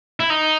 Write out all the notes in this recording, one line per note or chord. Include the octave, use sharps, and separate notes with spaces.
E4
D#4